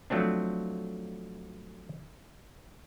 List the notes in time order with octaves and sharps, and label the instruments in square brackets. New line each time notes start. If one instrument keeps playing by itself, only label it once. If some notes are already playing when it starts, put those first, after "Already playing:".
[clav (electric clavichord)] F3 F#3 A3 C4 D4